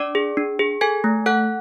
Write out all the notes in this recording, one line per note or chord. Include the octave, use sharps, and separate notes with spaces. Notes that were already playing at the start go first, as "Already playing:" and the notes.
Already playing: D4 D5 D6
G#4
D4
G#4
A4 G#5 G#6
A3
A4 F#5 F#6